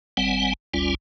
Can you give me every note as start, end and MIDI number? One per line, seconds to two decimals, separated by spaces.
0.17 0.53 32
0.17 0.53 55
0.17 0.53 60
0.17 0.53 78
0.17 0.53 80
0.74 0.94 31
0.74 0.94 38
0.74 0.94 55
0.74 0.94 61
0.74 0.94 65
0.74 0.94 80